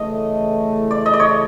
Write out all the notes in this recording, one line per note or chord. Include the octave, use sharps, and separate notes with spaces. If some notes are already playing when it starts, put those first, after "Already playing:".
Already playing: C#3 E3 A3 D#5
D5
D#5
D5
C#5